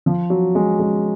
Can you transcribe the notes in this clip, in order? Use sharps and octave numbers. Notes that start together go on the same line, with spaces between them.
F3
F#3
G#3
G#3